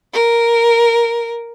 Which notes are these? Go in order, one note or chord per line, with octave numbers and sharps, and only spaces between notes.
A#4